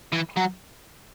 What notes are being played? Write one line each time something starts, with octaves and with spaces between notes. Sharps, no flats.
E3
F#3